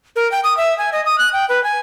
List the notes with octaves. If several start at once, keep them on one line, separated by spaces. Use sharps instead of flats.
A#4
G5
D#6
E5
G#5
D#5
D#6
F#6
G5
B4
G#5